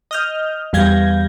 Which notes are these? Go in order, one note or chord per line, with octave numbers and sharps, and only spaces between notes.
D#5 F6 G6
E2 G3 F5 G6 G#6 A#6